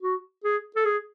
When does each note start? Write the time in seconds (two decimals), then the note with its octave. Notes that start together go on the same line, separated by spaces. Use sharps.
0.02 F#4
0.44 G#4
0.76 A4
0.85 G#4